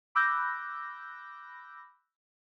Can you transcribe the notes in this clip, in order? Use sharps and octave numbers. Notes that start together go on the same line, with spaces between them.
B5 D6 E6 F#6 G6 A#6